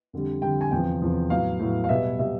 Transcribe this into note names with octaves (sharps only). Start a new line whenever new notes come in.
F2 D3 G3
F2 D3 G3 G5
G#5
E2 C3 F3 G5
E2 C3 F3
A2 F#3 B3 F5
A2 F#3 B3
F5
B2 G3 B3 E5
B2 G3 B3 E5